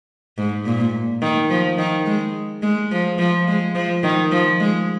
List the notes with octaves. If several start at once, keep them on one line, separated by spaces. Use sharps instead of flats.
G#2
A#2
D#3
F3
D#3
G#3
G#3
F3
F3
G#3
F3
D#3
F3
G#3